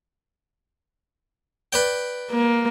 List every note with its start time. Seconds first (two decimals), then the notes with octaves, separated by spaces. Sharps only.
1.73 B4 D5 G5
2.31 A#3